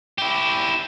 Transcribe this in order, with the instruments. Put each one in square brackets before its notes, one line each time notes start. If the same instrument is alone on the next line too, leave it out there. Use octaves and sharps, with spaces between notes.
[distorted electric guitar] E4 G4